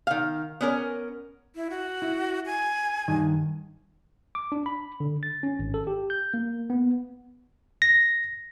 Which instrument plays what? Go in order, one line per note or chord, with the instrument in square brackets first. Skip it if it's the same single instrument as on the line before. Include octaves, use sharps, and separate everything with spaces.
[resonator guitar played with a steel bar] D#3 F5
B3 C#4 A#4
[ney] E4
F#4
[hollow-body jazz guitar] E4
[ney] G#5
[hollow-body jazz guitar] G2 D#3
[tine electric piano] D6
D4
B5
D3
A6
C#4
G#1
A4
G4
G6
A#3
B3
A#6